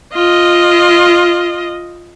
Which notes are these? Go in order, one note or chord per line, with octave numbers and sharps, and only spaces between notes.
F4 D#5